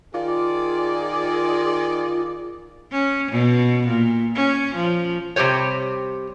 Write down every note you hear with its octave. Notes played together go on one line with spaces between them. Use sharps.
D#3 F4 G#4 D5
C#4
B2
A#2
C#4
F3
C3 G3 G4 C5 C#5